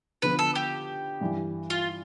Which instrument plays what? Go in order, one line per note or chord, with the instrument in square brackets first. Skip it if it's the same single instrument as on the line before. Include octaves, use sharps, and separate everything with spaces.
[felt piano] D3 F3 B3 F4 [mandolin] B4
[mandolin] A4
G4
[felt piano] G2 E3 G3
[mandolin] F4